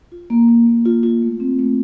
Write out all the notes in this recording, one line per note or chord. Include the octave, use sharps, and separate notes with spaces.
F4
A#3
A#3
A#3
F4
F4
A3
C4
A3